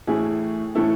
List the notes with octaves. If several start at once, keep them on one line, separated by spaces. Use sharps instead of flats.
A2 E3 A3 E4 G#4
A2 E3 A3 E4 A4